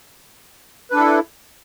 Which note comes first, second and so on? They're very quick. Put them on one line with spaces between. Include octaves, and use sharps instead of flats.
B4 D4 A4 E4